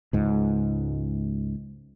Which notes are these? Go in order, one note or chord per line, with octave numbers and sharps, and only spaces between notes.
C#2 G#2